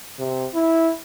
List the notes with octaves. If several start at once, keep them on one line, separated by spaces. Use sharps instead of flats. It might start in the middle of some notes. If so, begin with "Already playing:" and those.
C3
E4